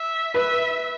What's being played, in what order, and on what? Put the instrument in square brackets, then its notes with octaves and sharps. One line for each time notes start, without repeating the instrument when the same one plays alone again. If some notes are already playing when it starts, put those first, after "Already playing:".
Already playing: [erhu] E5
[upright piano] B4 [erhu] E5